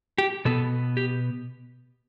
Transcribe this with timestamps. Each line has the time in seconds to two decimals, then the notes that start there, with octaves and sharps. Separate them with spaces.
0.18 G4
0.45 B2 B3 A4
0.97 G4